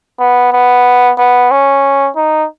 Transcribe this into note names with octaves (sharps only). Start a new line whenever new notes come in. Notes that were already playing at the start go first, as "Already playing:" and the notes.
B3
B3
B3
C#4
D#4